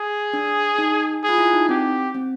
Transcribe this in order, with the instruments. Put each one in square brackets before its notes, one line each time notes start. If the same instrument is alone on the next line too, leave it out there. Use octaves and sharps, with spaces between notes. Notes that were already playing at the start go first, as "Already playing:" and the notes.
Already playing: [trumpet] G#4
[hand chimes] D4
D#4
[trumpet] G#4
[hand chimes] F4
E4
D#4
[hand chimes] C4 [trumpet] G4
[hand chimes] C4